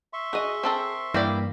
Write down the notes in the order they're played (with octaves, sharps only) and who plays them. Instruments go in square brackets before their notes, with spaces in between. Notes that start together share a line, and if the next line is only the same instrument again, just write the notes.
[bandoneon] E5 C6 C#6
[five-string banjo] F#4 D#5 [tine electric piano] G#4
[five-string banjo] C4 A4 A#4
[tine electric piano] G2 E3 A#3 [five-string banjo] E4 G4 D5